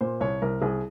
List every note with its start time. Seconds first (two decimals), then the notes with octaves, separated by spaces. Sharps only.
0.01 A#2 C5
0.20 C2 C#5
0.42 C2 A#4
0.61 C2 G#4